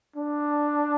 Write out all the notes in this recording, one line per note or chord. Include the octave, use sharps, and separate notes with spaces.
D4